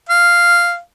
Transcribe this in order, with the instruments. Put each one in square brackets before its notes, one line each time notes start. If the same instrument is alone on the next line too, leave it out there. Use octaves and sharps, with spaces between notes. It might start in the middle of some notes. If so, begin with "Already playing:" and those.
[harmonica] F5